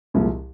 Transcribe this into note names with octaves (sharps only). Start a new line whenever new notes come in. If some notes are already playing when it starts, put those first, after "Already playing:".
C2 A#2 F3 G#3